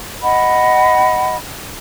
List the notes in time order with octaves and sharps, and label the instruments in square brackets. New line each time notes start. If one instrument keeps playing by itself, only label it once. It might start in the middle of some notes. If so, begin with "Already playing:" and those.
[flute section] D#5 F#5 B5